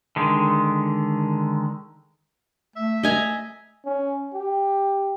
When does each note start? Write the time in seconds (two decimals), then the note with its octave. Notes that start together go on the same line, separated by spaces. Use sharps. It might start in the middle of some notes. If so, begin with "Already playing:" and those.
0.16 D3 D#3 G#3
2.76 A3 E5
3.03 D#5 G#5 A#5
3.86 C#4
4.34 G4